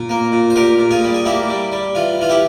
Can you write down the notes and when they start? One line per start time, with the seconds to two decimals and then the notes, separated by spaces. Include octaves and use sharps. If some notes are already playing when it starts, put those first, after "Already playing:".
Already playing: A#2
0.09 A#3
0.32 A#2
0.50 C5
0.56 A#2 G4 A#4
0.79 A#2
0.91 F4 G#4
1.02 G3
1.14 G#4
1.25 A#3 E4 G4
1.49 G3
1.72 G3
1.95 E3 F4
2.19 E3 F4
2.29 E4 G4